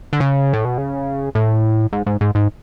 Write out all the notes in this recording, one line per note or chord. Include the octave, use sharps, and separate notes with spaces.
D3
C#3
A2
B2
C#3
A2
G#2
G#2
G#2
G#2